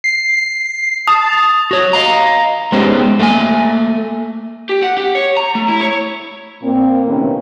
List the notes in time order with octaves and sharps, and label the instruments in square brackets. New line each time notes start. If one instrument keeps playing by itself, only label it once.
[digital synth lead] C7
[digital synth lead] A5 [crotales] D#6
[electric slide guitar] F#4 C#5
D#5 F5 A#5
G#3 B3 C#4 D#4 G4 C5
A3 A#3 F5 G#5
[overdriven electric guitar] G4
F#5
G4
C#5
A#5
A3
E4
C#5
[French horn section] A#2 A#3 C4
A2 C3 D#3 A#3 B3 C#4